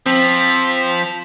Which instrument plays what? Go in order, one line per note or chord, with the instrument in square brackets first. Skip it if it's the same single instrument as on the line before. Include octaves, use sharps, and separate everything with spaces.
[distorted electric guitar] F3 [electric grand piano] C4 [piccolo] B6